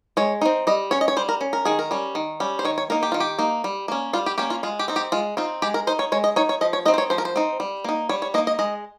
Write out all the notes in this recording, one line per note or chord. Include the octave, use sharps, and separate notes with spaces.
G#3 C#5
C4 D#4
G3 D#5
C#4 C#5
D#5
C#5
G3 C5
A#4
C#4
A#4
D#3 G#4
A#4
G3 C#4
D#3
G3 C#4
C5
D#3 C#5
C#5
A#3 D#4 A#4
G4
D#3 F4
G4
A#3 D#4
G3
A#3 C#4
G3 F4
G4
A#3 C#4 G4
F4
G#3 F4
G4
C4 D#4
G4
G#3 F4
C4 D#4 F4
G#3 G4
A#4
D#4 C5
C#5
G#3 C#5
D#5
D#4 C#5
C#5
F3 D#5
C#5
C4 D#4 D#5
C5
C#5
F3 C5
A#4
C5
C4 D#4
G3
A#3 D#4
G3 C#5
C#5
A#3 D#4 D#5
D#5
G#3 D#5